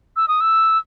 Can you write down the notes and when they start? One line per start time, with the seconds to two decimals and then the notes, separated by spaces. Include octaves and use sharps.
0.16 E6
0.28 D#6
0.41 E6